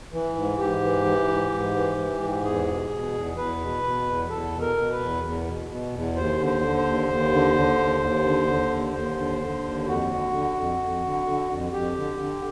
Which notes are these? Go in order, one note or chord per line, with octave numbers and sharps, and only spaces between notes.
E3
G#2
G#2 G4
E3
E3
G#2
G#2
E3
E3
G#2
E2 G#4
B2
B2
E2
E2 B4
B2
B2
E2
E2 A4
B2
A#4
B2
B4
E2
E2
B2
B2
E2
D#2 C5
D3
C5
D3
C5
D#2
D#2
D3
D3
D#2
D#2
D3
D3
D#2
D#2 C5
D3
D3
D#2
F2 F#4
D3
D3
F2
F2
D3
D3
F2
F2 G4
D3
D3